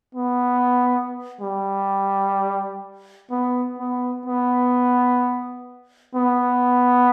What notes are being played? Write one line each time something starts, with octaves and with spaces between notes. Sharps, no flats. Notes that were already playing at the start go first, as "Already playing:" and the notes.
B3
G3
B3
B3
B3
B3